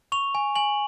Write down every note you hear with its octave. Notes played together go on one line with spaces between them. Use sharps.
C#6 F7
G#5
G#5 F#7